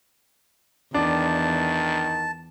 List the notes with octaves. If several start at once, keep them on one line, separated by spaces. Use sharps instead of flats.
E2 D#3 D4 A5